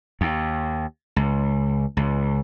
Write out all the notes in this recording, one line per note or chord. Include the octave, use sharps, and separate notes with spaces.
D#2
C#2
C#2